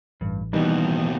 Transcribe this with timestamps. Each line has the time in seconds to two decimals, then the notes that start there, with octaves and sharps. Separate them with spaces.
0.21 A1 G2
0.53 D#2 B2 E3 G3 D#4